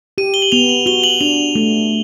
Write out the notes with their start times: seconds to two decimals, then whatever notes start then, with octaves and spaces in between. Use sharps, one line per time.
0.18 G4 D#7
0.34 G7
0.42 F#7
0.52 B3 F7
0.69 F#7
0.86 F#4 G7
1.04 F#7
1.21 D4 F7
1.55 A3